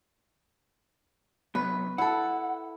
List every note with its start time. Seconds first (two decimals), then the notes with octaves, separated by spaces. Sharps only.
1.55 C3 F#3 B3 B4
1.98 E4 A4 F#5